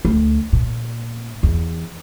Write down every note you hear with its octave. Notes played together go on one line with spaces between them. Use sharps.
D2
A#2
E2